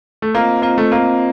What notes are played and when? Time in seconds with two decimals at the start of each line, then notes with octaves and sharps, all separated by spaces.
0.22 A3
0.34 A#3 C4 F4 C5 D#5
0.62 A#3 C4 F4 C5 D#5
0.78 A3
0.91 A#3 C4 F4 C5 D#5